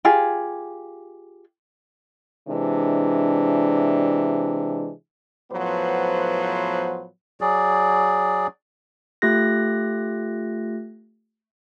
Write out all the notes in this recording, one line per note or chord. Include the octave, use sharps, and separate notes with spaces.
F4 G4 G#4
C3 E3 G#3 D4
A2 F3 F#3 B3 B4 C5
F#3 G#4 D5
A3 F4 G4 F#6 A#6